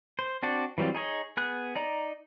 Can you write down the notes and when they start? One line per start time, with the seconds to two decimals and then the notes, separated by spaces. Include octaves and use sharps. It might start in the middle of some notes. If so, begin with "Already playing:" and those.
0.19 C5
0.43 C4 D4 F#4 D5
0.78 E3 F#3 G3 C4 F4
0.95 D#4 G#4 C#5 D#5
1.37 B3 G#4 F#6
1.76 D#4 D5 A#5